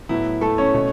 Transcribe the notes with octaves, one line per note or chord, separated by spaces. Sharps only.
A2 F#3 B3 E4
A3 A4
C#4 C#5
B2 A3